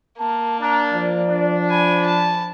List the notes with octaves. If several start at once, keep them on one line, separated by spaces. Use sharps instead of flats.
A#3 A5
D4 A#5
F3 D5
D4
G#5 B5
A5